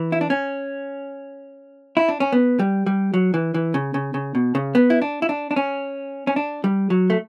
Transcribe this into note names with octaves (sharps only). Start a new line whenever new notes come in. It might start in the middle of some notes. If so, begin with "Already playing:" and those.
Already playing: E3
E4
D4
C#4
E4
D4
C#4
B3
G3
G3
F#3
E3
E3
C#3
C#3
C#3
B2
C#3
B3
E4
D4
E4
D4
D4
C#4
C#4
D4
G3
F#3
A3